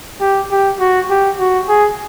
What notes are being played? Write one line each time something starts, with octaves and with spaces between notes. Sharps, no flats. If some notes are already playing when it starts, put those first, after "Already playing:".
G4
G4
F#4
G4
F#4
G#4